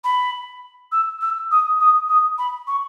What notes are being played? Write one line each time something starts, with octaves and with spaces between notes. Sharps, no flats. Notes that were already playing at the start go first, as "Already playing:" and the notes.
B5
E6
E6
D#6
D#6
D#6
B5
C#6